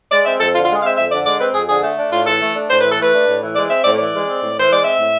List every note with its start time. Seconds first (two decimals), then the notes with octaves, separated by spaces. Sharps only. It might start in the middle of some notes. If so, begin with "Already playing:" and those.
0.11 G#3 D5
0.25 C4 E5
0.39 F2 A4
0.54 D3 F4
0.65 F4
0.69 G#3
0.75 G#4
0.82 C4 E5 F5
0.97 F2 E5
1.11 D3 D5
1.26 G#3 D5
1.40 C4 B4
1.54 F2 G#4
1.69 D3 G#4
1.83 A3
1.97 D4
2.12 A2 F4
2.26 E3 A4
2.41 A3
2.54 D4
2.70 A2 C5
2.80 E3 B4
2.92 A4
2.98 A3 B4
3.12 D4
3.26 A2
3.41 E3
3.55 G#3 D5
3.70 C4 E5
3.84 A2 D5
3.98 E3 D5
4.13 G#3
4.27 C4
4.41 A2
4.56 E3 C5
4.70 G#3 D5
4.84 C4 E5
4.99 A2